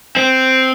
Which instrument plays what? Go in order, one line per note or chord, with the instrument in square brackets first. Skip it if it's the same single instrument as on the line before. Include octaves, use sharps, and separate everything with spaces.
[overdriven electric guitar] C4